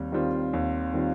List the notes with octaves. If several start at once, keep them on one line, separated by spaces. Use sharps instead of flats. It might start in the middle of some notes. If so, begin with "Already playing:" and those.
Already playing: D#2 G3 C4
D#3 G3 C4 F4
D#2
D#3 G3 C4 F4